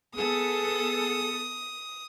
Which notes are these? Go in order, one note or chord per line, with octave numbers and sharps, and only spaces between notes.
B3 G#4 A4 D#6